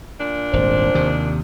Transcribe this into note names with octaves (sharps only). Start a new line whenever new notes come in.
A#2 D4
D#1 G#1 C5
D#2 C3 D#3